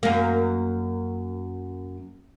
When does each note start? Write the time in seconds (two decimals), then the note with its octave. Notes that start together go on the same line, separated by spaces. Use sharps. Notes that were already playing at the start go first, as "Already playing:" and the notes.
0.03 F#2 A#3